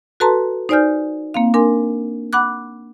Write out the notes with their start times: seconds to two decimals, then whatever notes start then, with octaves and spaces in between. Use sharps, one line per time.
0.20 F#4 A4 B4 A5 A#5 C6
0.69 D#4 C5 D5 G#5 F6 G6
1.34 A#3 C4 F5
1.54 D4 A#4 G#5 C6
2.33 F#5 B5 D6 F#6